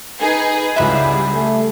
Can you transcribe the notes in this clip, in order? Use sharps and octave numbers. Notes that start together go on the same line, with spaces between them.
D#4 G#4 B4
C#2 G3 E4 G#4 E5 F#5 B5
A3